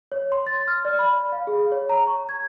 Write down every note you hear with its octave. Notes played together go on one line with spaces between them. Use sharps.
C#5
C6
A6
F6
D5
B5
F5
G#4
C#5
A#5
C#6
G#6